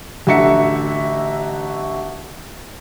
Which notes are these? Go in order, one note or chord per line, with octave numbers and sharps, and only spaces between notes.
A1 D3 F#4 E5 A#5 C#7